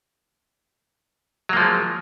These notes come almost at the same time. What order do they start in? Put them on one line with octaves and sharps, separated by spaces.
F#3 A#3 F3 G#3